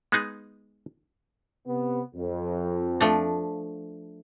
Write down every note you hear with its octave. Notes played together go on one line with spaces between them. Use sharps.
G#3 B3 D#4 G#4
C3 B3
F2
F3 A3 D4